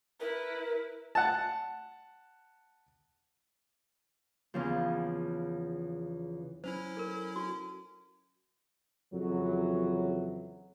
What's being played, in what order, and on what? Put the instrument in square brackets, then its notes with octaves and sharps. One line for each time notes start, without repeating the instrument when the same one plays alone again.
[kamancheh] E4 B4 [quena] A#4
[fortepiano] F#5 A5
[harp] E2 C#3 F3
[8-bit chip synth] F#3 C#4 E4 [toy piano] C5
[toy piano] A4 A#4
F#4
[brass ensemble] F2 C#3 E3 F#3